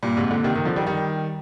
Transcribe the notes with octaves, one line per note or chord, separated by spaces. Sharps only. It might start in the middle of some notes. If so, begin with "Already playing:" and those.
G2 A#2
G#2 C3
A#2 D3
C3 D#3
C3 D#3
D3 F3
D#3 G3
D#3 G3